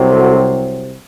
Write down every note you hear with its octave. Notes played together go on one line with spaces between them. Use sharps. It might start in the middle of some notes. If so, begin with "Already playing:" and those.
Already playing: C2 C3 F#3 C4
F#4 A4